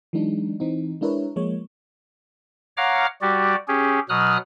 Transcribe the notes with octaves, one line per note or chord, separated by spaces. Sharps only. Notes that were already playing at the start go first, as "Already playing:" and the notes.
E3 F#3 G#3 D4 D#4
E3 C4 D#4
G#3 D4 E4 A#4 B4 C#5
F3 G#3 A#3 C#5
C#5 F5 F#5 A#5 D6 F6
G3 F#4 G4 D5
C#4 G4 G#4
B2 F#3 D#6 F6 F#6